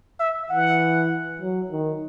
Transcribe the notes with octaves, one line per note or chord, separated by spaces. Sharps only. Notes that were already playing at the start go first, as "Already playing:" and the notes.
E5
E3 F#5
F#3
D#3